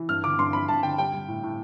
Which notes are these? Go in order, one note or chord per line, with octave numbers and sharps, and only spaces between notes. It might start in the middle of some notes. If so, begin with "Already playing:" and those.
Already playing: E3
G2 F6
D3 D6
G2 C6
F3 B5
G2 A5
D3 G5
G3 G5
G3
A2
A2